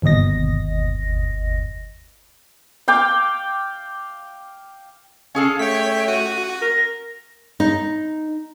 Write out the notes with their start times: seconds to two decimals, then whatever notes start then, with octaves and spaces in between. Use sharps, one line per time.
0.02 G1 D#2 B2 D#5 A#6
2.88 F5 G5 D6
5.35 C#4 G#4 A4 F5
5.59 A3 C#5 G5 B6
6.08 F#4 D#7
6.62 A#4 A#6
7.60 D#4